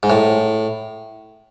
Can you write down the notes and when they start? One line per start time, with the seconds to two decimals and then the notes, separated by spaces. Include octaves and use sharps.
0.03 G#2
0.10 A2